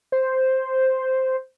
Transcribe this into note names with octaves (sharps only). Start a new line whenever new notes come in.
C5